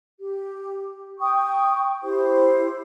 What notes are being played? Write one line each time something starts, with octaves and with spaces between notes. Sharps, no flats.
G4
G5 C#6 D#6
E4 G4 C5